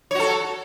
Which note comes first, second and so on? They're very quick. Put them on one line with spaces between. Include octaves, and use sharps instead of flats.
C#5 F#4 A4